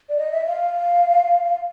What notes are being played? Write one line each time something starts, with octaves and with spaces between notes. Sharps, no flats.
D5
D#5
E5
F5